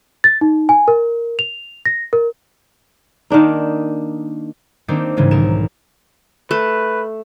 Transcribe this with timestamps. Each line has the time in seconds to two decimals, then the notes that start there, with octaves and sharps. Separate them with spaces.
0.24 A6
0.41 D#4
0.69 G#5
0.88 A#4
1.39 F7
1.85 A#6
2.13 A#4
3.30 D#3 A#3 D4 D#4
4.88 D#3 A#3 C4 D4 D#4
5.17 G#2 C#3 E3 G3 G#3
5.31 B1 A#4 E7
6.51 A3 B4